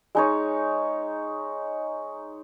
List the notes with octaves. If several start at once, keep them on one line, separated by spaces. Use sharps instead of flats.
G#3 D#4 C#5